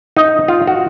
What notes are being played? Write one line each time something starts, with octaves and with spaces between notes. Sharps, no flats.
D#4
F4
F#4